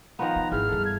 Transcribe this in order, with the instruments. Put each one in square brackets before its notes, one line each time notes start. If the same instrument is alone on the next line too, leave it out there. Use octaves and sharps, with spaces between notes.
[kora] D#3 F3 B3 [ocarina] F5 [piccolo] A#5
[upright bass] E4
[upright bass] G#1 [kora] E3 [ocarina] G#4 [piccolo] F6
[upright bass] D2 G2 [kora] A4
[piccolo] G#6